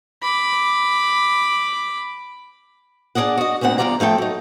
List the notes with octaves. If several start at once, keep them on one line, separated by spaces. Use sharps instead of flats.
B5 D6
D4 G#4 A4 D5 D#5 F#5
F#4 D#5
D2 A#2 D3 C4 F#5
E2 G2 F#3 F4 D5 A#5
F3 A3 A4 G5
F#3 D#4